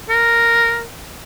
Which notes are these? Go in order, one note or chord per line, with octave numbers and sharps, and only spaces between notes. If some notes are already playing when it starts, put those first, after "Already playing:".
A#4